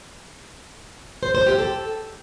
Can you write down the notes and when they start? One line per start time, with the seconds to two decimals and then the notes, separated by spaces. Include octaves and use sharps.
1.23 C5
1.35 C5
1.47 G4
1.59 A4